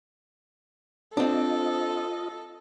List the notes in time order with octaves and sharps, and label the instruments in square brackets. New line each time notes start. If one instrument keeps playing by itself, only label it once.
[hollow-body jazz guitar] C4 D4 [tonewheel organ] F4 D#5 [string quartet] A4